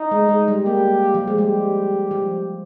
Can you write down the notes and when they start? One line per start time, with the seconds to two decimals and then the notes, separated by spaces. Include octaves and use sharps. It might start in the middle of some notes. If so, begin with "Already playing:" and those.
Already playing: D#4
0.11 G#3
0.29 G#3
0.48 G3
0.66 A#3 G4
1.14 F3
1.28 G#3
1.38 G3 G4
2.11 F3